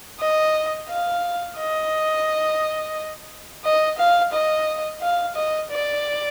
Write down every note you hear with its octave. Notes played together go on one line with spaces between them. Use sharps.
D#5
F5
D#5
D#5
F5
D#5
F5
D#5
D5